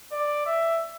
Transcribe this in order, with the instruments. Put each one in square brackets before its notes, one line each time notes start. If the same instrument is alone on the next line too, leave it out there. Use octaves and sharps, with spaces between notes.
[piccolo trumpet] D5
E5